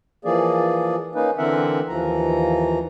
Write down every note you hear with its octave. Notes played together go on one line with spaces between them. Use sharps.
E3 F3 A#3 G#4 D5
A#3 C#4 D#4 B4
D3 E3 C4 A#4 E5 F#5
D#2 E3 F3 A#5